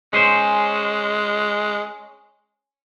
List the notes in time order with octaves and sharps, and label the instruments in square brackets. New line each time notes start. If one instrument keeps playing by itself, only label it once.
[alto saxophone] G#3 [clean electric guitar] C#4 G#4 C5